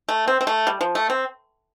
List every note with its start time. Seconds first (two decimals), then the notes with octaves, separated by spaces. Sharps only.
0.09 A3
0.28 C4
0.41 C4
0.47 A3
0.67 G3
0.81 F3
0.95 A3
1.10 C4